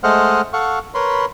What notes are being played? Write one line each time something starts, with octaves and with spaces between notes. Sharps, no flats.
G#3 A3 C5 D#5 F#5 F6
A4 F5 F#5 C#6
A#4 B4 C#5 B5 C6